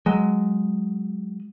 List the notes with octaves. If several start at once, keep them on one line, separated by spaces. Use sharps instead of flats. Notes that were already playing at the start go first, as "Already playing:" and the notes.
F#3 G#3